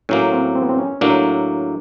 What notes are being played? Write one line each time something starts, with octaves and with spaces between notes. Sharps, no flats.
A2 F#3 A#3 C#4
C4
C4
B3
C4
C#4
A2 F#3 A#3 D4